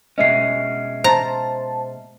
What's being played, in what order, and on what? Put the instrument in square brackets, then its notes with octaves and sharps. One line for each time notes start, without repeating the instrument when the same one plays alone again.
[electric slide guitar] B2 G#3 C#4 [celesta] D#5 E5 C7
[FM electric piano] C5 A5 [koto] A#5